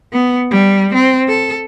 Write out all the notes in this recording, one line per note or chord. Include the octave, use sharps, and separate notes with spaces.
B3
G3
C4
A4